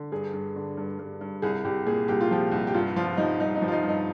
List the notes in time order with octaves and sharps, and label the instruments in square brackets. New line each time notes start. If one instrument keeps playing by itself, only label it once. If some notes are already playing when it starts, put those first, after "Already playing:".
Already playing: [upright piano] D3
G2 G#4
G2
D3
G2
G2
G2
C2 G#4
C2 G4
A#2 G#4
C2 G4
F4
F3 G4
C2
G4
G2 F4
F3 F4
F3 D#4
G2 D#4
D#4
F3
F4
D#4
G2
D#4